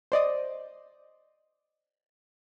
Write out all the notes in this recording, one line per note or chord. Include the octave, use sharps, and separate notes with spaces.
C5 D5 D#5